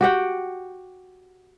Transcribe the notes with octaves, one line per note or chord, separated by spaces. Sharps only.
F#4 G4 F#5 G5